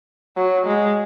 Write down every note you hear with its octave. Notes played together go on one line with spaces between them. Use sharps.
F#3
G#3